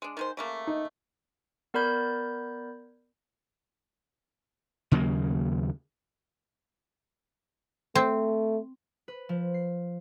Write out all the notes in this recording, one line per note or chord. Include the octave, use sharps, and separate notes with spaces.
G#3 D4
D#3 G#3 C5
C#3 A3 A#3
D#4
B3 A#4 D5 B5 G6 G#6
D#2 C#3 F#3 A#3
A3 C4
B4
F3
C7